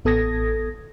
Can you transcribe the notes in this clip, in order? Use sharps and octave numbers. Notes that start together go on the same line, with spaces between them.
A1 B3 A4 D#6 G#6 A#6